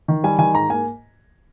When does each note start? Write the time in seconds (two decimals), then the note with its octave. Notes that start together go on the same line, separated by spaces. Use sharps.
0.08 D#3
0.24 G3 G#5
0.38 D#3 G#5
0.54 G#2 A#5
0.70 A#3 G#5